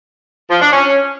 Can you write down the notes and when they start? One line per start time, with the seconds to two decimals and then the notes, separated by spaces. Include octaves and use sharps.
0.50 F3
0.61 D4
0.72 C#4